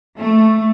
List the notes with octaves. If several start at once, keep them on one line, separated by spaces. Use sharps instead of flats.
A3